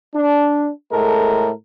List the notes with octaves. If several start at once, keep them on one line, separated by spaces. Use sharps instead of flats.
D4
A2 G#3 A4 A#4